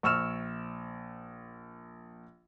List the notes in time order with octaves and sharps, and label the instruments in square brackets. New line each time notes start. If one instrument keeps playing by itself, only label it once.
[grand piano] A#1 C#6 E6 F6 E7